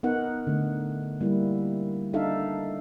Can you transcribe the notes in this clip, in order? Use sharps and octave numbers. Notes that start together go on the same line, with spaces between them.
B3 D#4 A#4 F#5
D3 A3
G3 A#3 E4
D4 D#4 A4 E5 F5